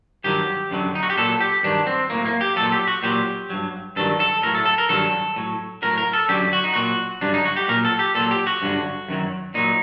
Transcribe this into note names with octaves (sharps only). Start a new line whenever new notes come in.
G2 D#3 F#3 G4
F#2 D3 F#3
D#4
F#4
G4
A#2 F#3 A4
G4
G2 D#3 F#3 D4
C4
A2 F#3 A#3
A#3
G4
A#2 F#3 A4
G4
F#4
A#2 F#3 G4
G2 F#3
G2 D#3 F#3 A4
A4
A2 F#3 A#4
A4
A4
A#4
G2 D#3 F#3 A4
A2 F#3
A2 F#3 A#4
A#4
A4
F#2 D3 F#3 G4
F#4
D#4
A#2 F#3 F#4
G2 D3 F#3 D4
D#4
F#4
G4
A#2 F#3 A#4
A4
G4
A#2 F#3 A4
G4
F#4
G2 D3 F#3
F#2 D#3 F#3
A#2 F#3 D#4